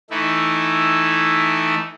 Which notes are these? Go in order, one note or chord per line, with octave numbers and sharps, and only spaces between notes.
E3 A3 D#4 E4